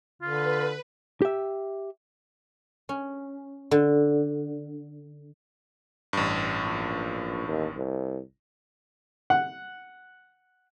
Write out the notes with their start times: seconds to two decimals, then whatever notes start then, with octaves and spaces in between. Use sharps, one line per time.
0.22 D3 F4 B4
1.22 G4 E5
2.89 C#4
3.71 D3
6.13 A1 G2
6.63 A#1
7.48 D#2
7.76 C2
9.30 F#5